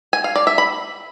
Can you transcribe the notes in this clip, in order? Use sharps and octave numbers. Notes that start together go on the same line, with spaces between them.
G#5
F5
D5
E5
B5